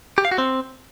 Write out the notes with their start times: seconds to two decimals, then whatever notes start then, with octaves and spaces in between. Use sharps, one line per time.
0.18 G4
0.25 F5
0.31 F#4
0.38 C4